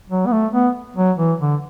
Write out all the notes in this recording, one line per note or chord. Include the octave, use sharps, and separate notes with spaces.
F#3
B3
A3
B3
F#3
E3
D3